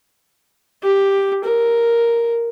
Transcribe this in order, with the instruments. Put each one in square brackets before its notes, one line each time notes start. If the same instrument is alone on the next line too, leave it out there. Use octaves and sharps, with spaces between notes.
[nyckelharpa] G4
A#4